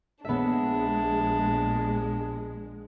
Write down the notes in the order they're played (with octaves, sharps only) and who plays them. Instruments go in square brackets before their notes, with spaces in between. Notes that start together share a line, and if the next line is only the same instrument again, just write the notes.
[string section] A#1 G#3 [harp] B3 E5 [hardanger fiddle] D4